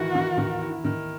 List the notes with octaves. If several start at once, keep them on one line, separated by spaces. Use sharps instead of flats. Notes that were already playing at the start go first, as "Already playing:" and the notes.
Already playing: D#3 E3 E4 F#4
D#3
D#3
E4
D#3